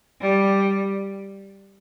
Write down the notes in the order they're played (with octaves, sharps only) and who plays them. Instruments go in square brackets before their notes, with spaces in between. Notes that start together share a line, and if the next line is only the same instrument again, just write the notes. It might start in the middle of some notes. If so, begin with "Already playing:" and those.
[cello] G3